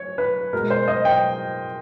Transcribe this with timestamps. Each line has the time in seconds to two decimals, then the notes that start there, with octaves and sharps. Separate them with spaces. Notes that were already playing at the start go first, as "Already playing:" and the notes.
Already playing: C#5
0.18 B4
0.53 B2 G#3 A#4
0.70 C5
0.88 D#5
1.05 G5